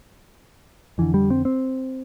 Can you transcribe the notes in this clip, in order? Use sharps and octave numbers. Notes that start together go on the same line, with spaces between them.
F2 D3 E3
G3
C4
C4